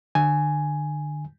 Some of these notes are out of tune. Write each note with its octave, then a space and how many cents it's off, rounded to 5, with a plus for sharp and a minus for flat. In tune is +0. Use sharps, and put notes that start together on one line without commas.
D3 +30 G#5 +0